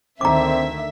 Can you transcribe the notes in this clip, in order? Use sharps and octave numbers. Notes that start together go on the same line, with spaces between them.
D2 D3 D#3 C4 E5 A#5 D6